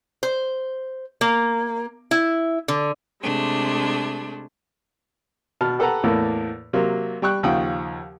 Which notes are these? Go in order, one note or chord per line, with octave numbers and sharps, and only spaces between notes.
C5
A#3
E4
D3
C3 G#3 A3 D4
B2 A5 F6
G4 A4 B4 F#5 A#5
E2 A2 A3 A#3
C3 F#3 A#3
G3 G5 C#6 F#6
D#2 C#3 F3 F#5 G5 D#6